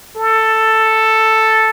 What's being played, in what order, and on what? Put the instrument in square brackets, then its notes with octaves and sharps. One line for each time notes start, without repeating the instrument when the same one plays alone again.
[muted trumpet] A4